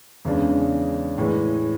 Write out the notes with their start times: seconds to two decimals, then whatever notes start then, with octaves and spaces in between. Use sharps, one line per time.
0.25 E2 C#3 G#3 D4
1.18 A2 E3 G#3